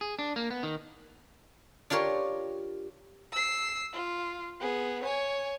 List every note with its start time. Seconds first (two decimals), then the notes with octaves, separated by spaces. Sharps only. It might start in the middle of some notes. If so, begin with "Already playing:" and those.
0.01 G#4
0.19 D4
0.36 A#3
0.51 B3
0.63 D#3
1.90 D4 F4 G4 A#4 C#5
3.32 E6 C7
3.93 F4
4.60 B3 G#4
5.04 C#5 G#5